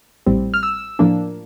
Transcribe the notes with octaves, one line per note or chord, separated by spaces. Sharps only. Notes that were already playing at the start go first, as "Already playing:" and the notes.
A#1 A2 G3 C4
F6
E6
A2 F3 A#3 D4